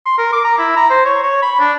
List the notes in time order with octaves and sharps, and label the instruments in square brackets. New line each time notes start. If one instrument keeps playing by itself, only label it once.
[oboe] C6
A#4
D6
A#5
E4
A#5
C5
C#5
C#5
B5
D4